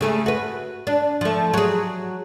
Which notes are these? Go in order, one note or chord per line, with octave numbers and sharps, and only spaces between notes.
C#3 A3 G#4
F#4 B4
D4
F3 A3
F#3 G#4